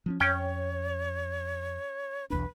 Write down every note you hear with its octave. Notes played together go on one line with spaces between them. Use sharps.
F3 C4 C#4
F2 C#4 C#5 G5
B1 E2 D4 B4